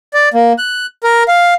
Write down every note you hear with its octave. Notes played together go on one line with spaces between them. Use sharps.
D5
A#3
F#6
A#4
F5